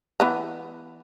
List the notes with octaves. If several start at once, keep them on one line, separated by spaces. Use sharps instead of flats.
E3 B3 A#5